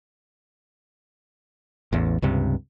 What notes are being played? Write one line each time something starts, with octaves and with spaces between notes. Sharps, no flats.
A1 E2
C#2 G2 C3